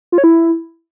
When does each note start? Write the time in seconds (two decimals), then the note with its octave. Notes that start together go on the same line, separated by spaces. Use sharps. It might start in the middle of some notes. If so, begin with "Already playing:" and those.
0.12 F4
0.18 C#5
0.24 E4